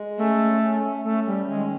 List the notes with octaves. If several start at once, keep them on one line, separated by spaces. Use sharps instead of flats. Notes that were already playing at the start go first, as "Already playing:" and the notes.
Already playing: G#3
A3 C#4
C#4
A3 C#4
G3
D#3 G#3